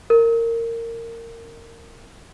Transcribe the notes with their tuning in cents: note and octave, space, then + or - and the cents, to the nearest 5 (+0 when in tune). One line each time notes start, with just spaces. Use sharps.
A#4 -20